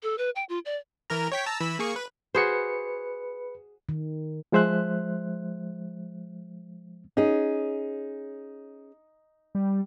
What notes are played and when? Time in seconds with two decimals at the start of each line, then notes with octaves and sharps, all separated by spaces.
0.03 A4
0.18 B4
0.36 G5
0.49 F4
0.65 D5
1.10 E3 A#4 A#5
1.32 C#5 G5 B6
1.46 A5 A#5 E6
1.61 E3 B5 E6
1.79 A#3 G#4 C#6
1.96 B4
2.35 F#4 G#4 B4 C5 C#7
3.89 D#3
4.52 F3 G#3 C5 E5 F#6
7.17 C#4 D#4 G#4
9.55 G3